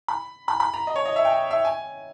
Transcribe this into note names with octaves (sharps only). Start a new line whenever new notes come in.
B5
B5
B5
A#5
D#5
C#5
D#5
E5
G5
E5
G#5